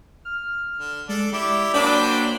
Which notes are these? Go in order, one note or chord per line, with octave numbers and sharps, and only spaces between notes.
F6
D3
G#3 D4 A4 D5
E4 G4 D5 E5 D6
F#3 A#3 D4 C5 G5 B5